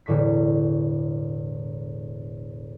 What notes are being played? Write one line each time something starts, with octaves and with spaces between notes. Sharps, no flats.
E1 A2 D3 C#6 B6